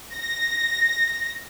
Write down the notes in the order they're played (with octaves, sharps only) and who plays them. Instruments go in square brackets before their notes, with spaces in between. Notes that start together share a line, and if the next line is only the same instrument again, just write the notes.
[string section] A#6